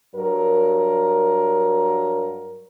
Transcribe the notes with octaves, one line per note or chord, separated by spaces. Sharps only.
G2 F#3 A#4